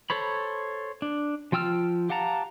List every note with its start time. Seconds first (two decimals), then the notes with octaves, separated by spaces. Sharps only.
0.10 A4 C5 C#5 B5
1.02 D4
1.52 F3 F4 G5 E6 F6
2.09 G4 F5 F#5 A5 A#5